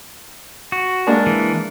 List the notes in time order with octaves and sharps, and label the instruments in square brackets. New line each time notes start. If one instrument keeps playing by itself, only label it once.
[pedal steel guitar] F#4
[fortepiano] G#3 A#3 D4
[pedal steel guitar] E3